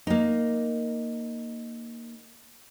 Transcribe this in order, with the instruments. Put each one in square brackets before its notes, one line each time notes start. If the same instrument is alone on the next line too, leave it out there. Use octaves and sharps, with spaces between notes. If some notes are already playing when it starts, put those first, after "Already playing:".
[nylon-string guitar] A#3 D#4